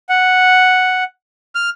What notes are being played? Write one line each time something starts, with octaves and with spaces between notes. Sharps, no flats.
F#5
F6